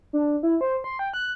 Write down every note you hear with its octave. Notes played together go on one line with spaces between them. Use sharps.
D4
E4
C5
C6
G5
F#6